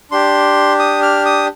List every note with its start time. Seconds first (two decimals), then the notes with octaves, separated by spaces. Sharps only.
0.11 D4 G4 C6
0.79 D#6
1.02 F6
1.25 D#6